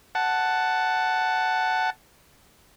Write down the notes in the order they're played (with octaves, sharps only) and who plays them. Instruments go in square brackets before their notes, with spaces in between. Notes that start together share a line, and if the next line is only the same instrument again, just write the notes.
[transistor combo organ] F#5 A5